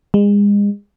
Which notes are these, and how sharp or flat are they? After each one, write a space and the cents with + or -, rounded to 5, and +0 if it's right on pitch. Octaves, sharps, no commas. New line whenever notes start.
G#3 -35